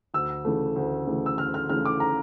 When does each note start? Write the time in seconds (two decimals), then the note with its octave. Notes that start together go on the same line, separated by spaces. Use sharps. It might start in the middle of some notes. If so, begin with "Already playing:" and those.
0.14 D2 E6
0.45 C#3 E3 A3
0.76 D2
1.07 C#3 E3 A3
1.26 E6
1.38 D2 F6
1.54 F6
1.69 C#3 E3 A3 F6
1.85 D6
2.00 A#5